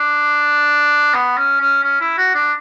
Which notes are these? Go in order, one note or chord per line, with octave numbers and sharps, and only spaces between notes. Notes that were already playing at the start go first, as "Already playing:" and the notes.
Already playing: D4
B3
C#4
C#4
C#4
E4
F#4
D4